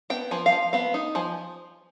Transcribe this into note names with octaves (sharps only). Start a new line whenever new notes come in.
B3 G5
F3 G#5
F5
F3
B3 F5
D#4
F3 G#5